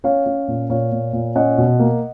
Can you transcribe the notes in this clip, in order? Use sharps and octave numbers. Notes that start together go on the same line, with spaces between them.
C#4 C#5 F5
C#4
A#2
A#2 C#5 F5
A#2
A#2
C#4 D#5 F#5
B2
A#3